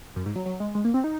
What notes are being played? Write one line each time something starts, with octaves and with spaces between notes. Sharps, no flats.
F#2
G#2
F#3
F#3
G#3
G#3
A#3
C4
D#4